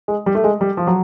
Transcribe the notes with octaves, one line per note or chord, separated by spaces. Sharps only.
G#3
G3
A3
G#3
G3
F3
F#3